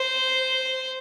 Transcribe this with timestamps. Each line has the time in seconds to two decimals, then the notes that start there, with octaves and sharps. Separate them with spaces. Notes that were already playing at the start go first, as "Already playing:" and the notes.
Already playing: C5